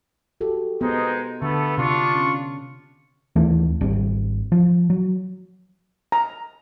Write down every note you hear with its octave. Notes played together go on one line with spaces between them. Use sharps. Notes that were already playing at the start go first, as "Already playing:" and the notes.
F#4 G4 A4
G#3 B3 C4 D#4 A4
D3 A3 B3 A4
C3 D4 F4 C#6
C#4
D#2 E3 A3 C4
G#1 G3 C4
F3
F#3
A#5